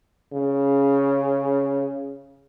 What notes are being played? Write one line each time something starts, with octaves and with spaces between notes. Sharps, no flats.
C#3